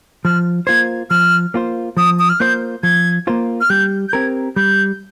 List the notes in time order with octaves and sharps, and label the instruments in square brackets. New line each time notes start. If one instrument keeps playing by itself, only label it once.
[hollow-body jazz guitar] F3 [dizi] F6
[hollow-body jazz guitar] A#3 F4 C5 [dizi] G#6
[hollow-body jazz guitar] F3 [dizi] F6
[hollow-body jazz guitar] A#3 F4 C5
[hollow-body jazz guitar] F3 [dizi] D#6
[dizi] D#6
F6
[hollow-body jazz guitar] A#3 F4 C5 [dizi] G6
[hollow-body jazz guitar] F3 [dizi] G#6
[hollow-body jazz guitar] A#3 F4 C5
[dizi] F6
[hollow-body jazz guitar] G3 [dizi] G6
[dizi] G6
[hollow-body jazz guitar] C4 G4 A#4 [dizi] G#6
[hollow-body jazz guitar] G3 [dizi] G6